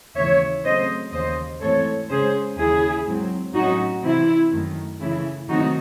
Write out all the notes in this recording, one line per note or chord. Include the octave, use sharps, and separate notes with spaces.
D#2 C#3 E3 C#5 E5
C#3 F#3 A3 C4 C5 D#5
D#2 C#3 E3 C5 D#5
G#2 E3 A3 C4 A4 C#5
C#3 G#3 C#4 G#4 C5
D#2 C#3 E3 E4 G#4
G#2 F#3 C4
A2 F#3 C#4 D#4 F#4
C3 E3 C4 E4
F#2 D#3 A3
C#3 E3 A3 E4
C3 D#3 F#3 A3 C4 D#4 F#4